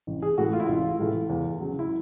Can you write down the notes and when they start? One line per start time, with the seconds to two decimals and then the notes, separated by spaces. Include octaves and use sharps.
0.07 A1
0.22 G#4
0.38 A2 E3 A3 F#4
0.53 F4
0.60 E4
0.67 A1 F4
0.99 A2 E3 A3
1.29 E2
1.60 C#3 F#3
1.79 E4